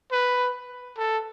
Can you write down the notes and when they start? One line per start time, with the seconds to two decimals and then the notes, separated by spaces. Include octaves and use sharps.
0.12 B4
0.98 A4